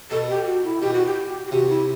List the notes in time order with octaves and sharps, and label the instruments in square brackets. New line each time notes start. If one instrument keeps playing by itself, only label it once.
[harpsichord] B2 [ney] A4
[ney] G4
F#4
E4
[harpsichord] B2 [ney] G4
[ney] F#4
G4
G4
[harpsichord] C3 [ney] F#4
[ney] E4